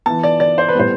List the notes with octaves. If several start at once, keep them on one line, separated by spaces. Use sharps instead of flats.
E3 B3 A5
D5
D5
C5
B4
A2 G3 B3 C5